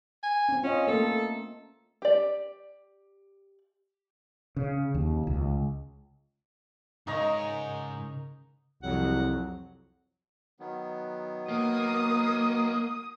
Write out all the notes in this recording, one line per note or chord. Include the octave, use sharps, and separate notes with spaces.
G#5
C4 C#4
C#4 F4 D#5
A3 A#3 A4
G4 D5
C#3
D#2
C#2
G#2 C#3 D#4 A#4 C#5 D#5 A#5
C2 F2 F#3 F#5
D#3 F#3 B3
A#3 D#6